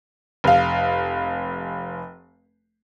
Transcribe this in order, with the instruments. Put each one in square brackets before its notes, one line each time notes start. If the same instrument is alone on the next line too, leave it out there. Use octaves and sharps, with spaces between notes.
[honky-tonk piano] F1 F5